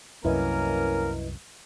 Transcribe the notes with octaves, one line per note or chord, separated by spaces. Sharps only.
C2 F#2 A#3 C#4 E4 A#4 B4 D#5